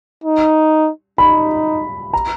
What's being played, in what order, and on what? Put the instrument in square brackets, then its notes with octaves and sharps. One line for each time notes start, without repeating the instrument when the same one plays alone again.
[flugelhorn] D#4
[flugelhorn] D#4 [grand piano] B5
[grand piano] A#5